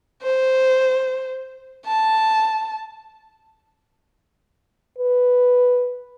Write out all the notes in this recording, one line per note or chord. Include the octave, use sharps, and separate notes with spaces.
C5
A5
B4